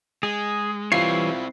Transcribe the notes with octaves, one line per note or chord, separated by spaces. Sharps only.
G#3 G#4
E3 G3 C4 E4 F4 C#5 C7